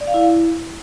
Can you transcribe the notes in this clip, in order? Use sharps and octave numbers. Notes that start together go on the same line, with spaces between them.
D5
F5
E4